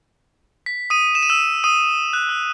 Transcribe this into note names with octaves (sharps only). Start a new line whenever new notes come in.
B6
D#6 D#7
E7
D#7
E6 E7
D#6 D#7
F#6
E6